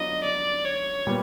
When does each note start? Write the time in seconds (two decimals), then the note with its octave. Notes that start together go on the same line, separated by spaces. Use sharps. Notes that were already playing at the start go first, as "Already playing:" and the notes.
Already playing: F#3 B3 D4 F4 D#5
0.24 D5
0.65 C#5
1.07 A#2 G3 B3